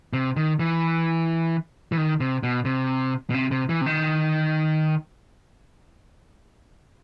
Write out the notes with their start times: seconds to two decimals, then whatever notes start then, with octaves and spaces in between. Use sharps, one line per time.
0.13 C3
0.36 D#3
0.59 E3
1.92 E3
1.97 D#3
2.20 C3
2.43 B2
2.65 C3
3.30 B2
3.34 C3
3.51 C3
3.69 E3
3.81 C3
3.86 D#3